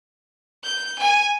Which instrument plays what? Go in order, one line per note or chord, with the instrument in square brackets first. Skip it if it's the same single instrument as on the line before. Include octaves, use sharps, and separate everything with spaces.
[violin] G6
G#5